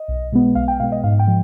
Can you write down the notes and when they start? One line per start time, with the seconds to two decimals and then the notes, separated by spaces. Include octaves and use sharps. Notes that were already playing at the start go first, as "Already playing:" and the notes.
Already playing: D#5
0.08 B1
0.32 B2 G#3 B3
0.55 B1 F5
0.68 G5
0.80 B2 G#3 B3 F5
0.92 D#5
1.04 G#2 F5
1.19 G5
1.27 F3 G#3